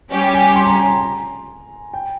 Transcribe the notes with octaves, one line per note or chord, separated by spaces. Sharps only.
G3 C#4 G4
G#5
C6
A#5
G#5
A#5
A#5
G5